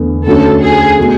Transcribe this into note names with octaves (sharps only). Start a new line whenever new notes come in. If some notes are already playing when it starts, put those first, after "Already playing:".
Already playing: E2 D3 A3
D2 D3 F#3 C#4 F#4 A4
G#4
B2 F#3 A3